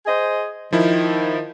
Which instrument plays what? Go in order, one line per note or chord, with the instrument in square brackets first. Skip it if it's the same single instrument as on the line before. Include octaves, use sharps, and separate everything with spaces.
[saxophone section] G#4 C5 D#5
[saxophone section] D#3 [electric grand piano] F3 E4